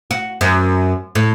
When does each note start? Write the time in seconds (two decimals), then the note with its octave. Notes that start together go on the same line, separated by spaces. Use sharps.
0.11 F#4
0.41 F#2
1.15 A2